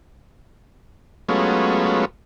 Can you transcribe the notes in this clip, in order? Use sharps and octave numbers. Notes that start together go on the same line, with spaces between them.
F#3 G#3 A3 B3 C#4 F4